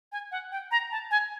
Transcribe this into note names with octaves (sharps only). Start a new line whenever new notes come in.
G#5
F#5
G5
A#5
A5
G#5